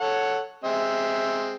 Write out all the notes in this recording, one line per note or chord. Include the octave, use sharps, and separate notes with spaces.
A4 C#5 F#5
G#3 C4 E5